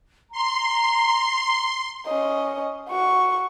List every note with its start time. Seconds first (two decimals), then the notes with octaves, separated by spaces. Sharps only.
0.32 A#5 C6
2.07 C#4 D#5
2.89 F#4 C#6